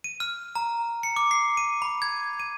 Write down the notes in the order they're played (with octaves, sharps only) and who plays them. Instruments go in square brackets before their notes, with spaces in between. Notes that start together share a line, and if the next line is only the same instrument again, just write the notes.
[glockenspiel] D#7
F6
A#5
C#7
D6
C7
D#7
B5
G#6
D#7